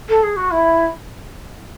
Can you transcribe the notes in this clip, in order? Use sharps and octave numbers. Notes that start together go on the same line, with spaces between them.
A4
G#4
F#4
E4